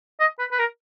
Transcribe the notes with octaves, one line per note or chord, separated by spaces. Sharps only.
D#5
B4
B4
A#4